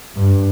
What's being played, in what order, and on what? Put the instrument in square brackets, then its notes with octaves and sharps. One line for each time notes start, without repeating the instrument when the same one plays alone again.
[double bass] G2